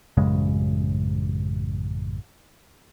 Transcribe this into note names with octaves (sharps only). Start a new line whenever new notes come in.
A1 F#2 C#3 G#3